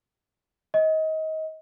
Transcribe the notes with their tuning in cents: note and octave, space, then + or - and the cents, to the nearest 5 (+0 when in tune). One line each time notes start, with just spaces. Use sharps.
D#5 +25